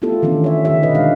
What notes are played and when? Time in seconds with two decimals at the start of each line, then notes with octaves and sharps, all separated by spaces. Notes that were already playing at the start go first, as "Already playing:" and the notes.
0.02 A3 B3 E4 F4 G4 A4
0.22 D#3 E3 B3 C#4 D4
0.44 C#5 E5
0.65 D3 D#3 F#3 D#4 G4 E5
0.83 B2 G4 B4 D#5
0.95 G#3 D4 F5